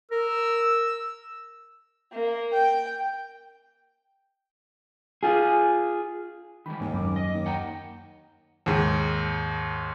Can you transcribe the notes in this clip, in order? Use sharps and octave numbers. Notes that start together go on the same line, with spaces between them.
A#4 E6
A#3
G5
F4 G#4
D#3 E3 G#3 B5
D#2 G#2
F#2 D6
D#5
D#2
F#5 G5 A#5
D#2 G#2